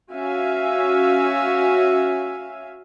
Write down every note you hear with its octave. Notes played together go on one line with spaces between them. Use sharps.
C#4 F#4 E5 F5 G#5